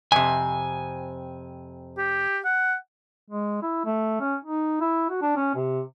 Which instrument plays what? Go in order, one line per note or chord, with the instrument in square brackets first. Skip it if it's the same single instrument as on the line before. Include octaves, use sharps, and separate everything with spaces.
[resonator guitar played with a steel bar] F2 C3 [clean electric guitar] G#5
[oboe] G4
F#5
[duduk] G#3
E4
A3
C#4
D#4
E4
F#4
D4
C#4
C3